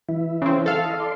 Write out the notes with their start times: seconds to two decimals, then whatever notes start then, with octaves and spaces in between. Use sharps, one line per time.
0.09 E3 E4
0.42 C#3 C4
0.66 A4 F5
0.84 D#5
1.00 D5 C6